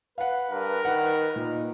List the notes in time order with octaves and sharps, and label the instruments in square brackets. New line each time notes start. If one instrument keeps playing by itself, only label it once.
[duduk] B4 [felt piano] F5 F#5
[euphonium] G2 [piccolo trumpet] A#4
[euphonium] D#3 [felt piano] F#5
[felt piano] A#2 [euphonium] D#4